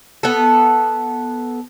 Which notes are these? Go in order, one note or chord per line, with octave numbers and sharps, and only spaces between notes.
B3 A4